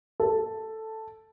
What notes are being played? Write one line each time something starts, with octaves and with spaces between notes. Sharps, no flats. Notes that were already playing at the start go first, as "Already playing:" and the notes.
A4